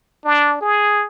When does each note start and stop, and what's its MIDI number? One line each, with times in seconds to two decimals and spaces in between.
0.24 0.56 62
0.61 1.06 68